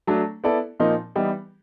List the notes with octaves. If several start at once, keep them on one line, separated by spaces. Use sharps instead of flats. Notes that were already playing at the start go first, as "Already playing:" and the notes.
F#3 A3 D4
B3 E4 A4 D5
A#2 F3 A#3 D#4
E3 G3 B3 D#4